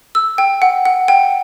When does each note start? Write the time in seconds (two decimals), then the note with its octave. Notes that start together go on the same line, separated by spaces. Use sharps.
0.15 E6
0.38 G5
0.62 F#5
0.85 F#5
1.08 G5